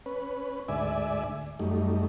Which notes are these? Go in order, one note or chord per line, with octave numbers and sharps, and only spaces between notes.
C#4 B4
D2 G#2 D5 E5 G#5
F#2 G3 A3 D#4